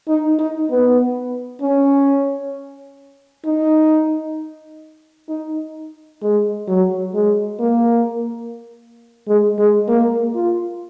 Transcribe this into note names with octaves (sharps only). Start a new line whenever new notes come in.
D#4
D#4
B3
C#4
D#4
D#4
G#3
F#3
G#3
A#3
G#3
G#3
A#3
F4